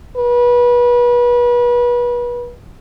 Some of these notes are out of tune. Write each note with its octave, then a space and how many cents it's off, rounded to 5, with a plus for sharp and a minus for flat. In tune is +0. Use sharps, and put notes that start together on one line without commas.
B4 -30